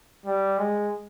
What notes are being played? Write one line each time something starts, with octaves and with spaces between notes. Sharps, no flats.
G3
G#3